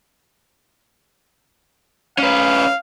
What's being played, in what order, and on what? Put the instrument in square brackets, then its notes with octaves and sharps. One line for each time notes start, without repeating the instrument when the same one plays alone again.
[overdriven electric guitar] C#4 B4 [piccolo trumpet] F5